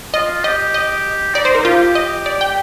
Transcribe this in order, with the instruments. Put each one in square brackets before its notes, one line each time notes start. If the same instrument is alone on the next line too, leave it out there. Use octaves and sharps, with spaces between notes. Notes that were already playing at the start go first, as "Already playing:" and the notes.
[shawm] F4 [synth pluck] D#5
[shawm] G4 [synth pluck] D#5
[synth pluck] D#5
[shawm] D#4 [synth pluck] D5
[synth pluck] C5
[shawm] D#4
[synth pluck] A#4
[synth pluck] F4 [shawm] G4
[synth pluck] D#5
D5
G5